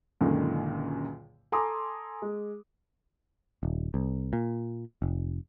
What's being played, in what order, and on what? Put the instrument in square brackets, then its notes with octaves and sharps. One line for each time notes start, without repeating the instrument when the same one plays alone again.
[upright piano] C#2 F#2 A#2 D3 D#3
A4 G#5 A#5 C6 D6 D#6
G#3
[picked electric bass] D#1
C2
A#2
F1